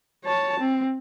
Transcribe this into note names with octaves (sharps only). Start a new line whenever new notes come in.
C#5 A5
C4